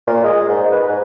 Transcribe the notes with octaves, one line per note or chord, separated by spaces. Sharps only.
A#2
G#3
G#2
B4
G#2